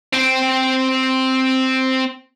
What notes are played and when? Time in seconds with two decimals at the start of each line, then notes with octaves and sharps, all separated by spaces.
0.13 C4 G5